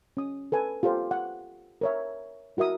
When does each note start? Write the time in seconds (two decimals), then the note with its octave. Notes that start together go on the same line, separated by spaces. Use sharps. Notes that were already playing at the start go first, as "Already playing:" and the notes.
0.17 C#4 D#6
0.52 A4 B4 G#5
0.83 F4 G4 A4 C5
1.11 F#5
1.81 A#4 C#5 E5
2.57 E4 F#4 A#4 E5 D#6